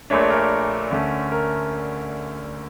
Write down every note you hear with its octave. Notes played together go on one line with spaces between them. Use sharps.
A#1 A#2 A3 D4 C#5
A#4
D2 D3 A3 C#4
A#4